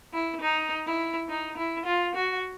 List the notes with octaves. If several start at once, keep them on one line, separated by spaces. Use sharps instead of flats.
E4
D#4
E4
D#4
E4
F4
F#4